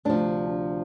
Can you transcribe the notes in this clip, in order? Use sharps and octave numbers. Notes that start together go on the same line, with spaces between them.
D2 C3 F3 D4